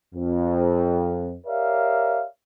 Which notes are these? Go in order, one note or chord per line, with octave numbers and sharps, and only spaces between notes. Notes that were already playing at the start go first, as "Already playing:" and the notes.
F2
G4 A#4 C#5 D5 E5 F5